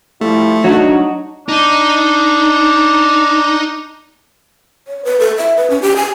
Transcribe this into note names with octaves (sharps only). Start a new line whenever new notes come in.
F3 G3 A3 E4
F#3 D4 D#4 F#4
D4 D#4
C#5
B4
A4
E5
B4
C#4
G4
G#5